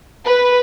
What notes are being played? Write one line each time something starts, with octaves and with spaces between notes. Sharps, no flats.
B4